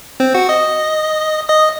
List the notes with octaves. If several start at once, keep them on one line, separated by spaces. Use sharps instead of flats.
C4 C5
F#4 F#5
D#5 D#6
D#5 D#6